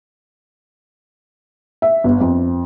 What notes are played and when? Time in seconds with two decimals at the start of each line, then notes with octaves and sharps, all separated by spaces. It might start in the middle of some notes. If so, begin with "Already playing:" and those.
1.82 E5
2.04 G1
2.21 F2